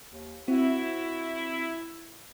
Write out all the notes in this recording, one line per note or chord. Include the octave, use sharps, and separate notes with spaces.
D#2
C4 E4 F#4